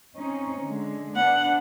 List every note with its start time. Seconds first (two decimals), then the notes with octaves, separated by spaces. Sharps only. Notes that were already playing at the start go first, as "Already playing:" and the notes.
0.17 C4 C#4 D#4
0.63 D3 G#3
1.16 B3 D4 F#5